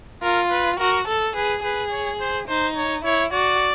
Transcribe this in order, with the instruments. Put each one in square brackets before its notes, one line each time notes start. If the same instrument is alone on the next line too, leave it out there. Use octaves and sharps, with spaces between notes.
[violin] F4 [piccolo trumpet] A#4
[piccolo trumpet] B4
[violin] F#4 [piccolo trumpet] A#4
[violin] A4
[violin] G#4 [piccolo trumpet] B4
[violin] G#4 [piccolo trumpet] B4
[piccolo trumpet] C#5
C5
[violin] D#4 [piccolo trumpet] C5
[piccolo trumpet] C#5
[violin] E4 [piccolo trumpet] C#5
[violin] F#4 [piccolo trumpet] D5